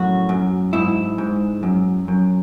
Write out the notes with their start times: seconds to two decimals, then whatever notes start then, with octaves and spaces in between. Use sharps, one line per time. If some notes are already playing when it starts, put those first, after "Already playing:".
Already playing: F#2 A2 F#4
0.29 F#2
0.73 G#2 E4
1.18 G#2
1.63 F#2
2.08 F#2